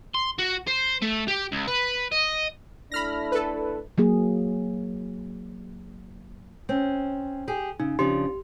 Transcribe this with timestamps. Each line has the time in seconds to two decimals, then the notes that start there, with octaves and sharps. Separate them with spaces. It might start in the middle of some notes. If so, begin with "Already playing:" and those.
0.15 C6
0.39 F#4
0.68 C5
1.02 A3
1.28 G4
1.52 C#2
1.67 B4
2.12 D#5
2.92 A3 D4 E4 B5 F6 A#6
3.32 A4 B4
3.98 F#3 A#3 G#4
6.69 C4 C#4
7.48 G4 G#4
7.80 C#3 D#4
7.99 C#3 F3 D4 G4 C6